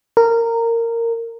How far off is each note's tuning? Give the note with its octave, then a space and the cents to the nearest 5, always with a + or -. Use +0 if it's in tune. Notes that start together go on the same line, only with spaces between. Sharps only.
A#4 -15